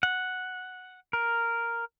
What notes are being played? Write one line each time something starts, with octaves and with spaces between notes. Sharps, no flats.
F#5
A#4